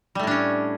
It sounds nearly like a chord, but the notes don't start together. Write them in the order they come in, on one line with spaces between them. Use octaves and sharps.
G3 A3 A2 D4 C#4